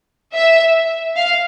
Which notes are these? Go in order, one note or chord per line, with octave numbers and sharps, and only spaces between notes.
E5
F5